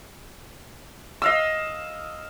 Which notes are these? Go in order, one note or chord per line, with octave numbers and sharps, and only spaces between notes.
D#5 F5 E6